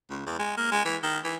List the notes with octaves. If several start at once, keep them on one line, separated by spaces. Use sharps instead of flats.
C#2
E2
G#3
A#3
G#3
E3
D#3
E3